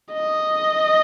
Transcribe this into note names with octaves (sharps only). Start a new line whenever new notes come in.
D#5